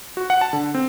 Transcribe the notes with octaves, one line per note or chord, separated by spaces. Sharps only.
F#4
F#5
A5
D3
C4